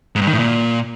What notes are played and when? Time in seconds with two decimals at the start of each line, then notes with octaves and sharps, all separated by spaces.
0.16 G#2
0.21 G2
0.27 D#3
0.33 A2
0.39 A#2